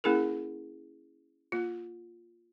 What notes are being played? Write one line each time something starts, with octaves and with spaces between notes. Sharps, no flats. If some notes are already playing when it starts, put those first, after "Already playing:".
A#3 C#4 E4 G#4 A#4
A#3 F4